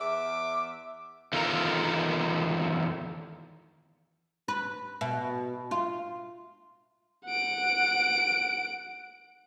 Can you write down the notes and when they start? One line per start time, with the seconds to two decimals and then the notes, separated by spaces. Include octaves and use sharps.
0.01 E2 E5 D6
1.33 E2 D#3 F4 A4 A#4 A#5
4.48 B4
5.01 B2
5.71 F4
7.25 F#5 D7